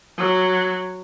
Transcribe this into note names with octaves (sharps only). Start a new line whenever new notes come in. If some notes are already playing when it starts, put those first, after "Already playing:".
F#3